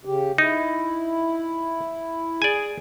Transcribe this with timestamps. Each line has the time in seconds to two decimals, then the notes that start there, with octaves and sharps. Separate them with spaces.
0.05 C#3 G4
0.38 D#4 E4
2.42 G#4 D5 G#5